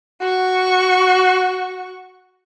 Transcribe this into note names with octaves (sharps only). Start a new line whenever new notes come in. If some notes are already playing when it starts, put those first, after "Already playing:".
F#4 C#6